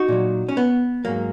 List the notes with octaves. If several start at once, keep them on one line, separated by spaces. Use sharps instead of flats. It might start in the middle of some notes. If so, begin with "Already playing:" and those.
Already playing: D#4 F#4
A#2 F#3
C#4
B3
G#2 F#3 A#3